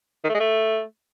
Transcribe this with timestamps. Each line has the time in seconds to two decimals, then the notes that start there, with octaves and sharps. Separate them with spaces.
0.24 D#3
0.29 A3
0.35 G#3
0.40 A3